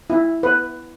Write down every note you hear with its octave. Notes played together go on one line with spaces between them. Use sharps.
E4
B4